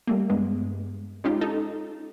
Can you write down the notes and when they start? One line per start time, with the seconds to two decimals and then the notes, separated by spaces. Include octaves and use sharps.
0.07 G3 A3 A#3
0.30 G2 G#3 B3
1.24 G#3 C#4 D#4 F4 G4
1.41 D#4 A4